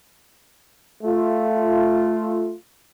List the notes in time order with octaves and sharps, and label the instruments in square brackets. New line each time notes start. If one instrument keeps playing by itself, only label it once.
[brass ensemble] A3 F4